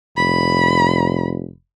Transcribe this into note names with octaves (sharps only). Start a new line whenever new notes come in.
F1 B5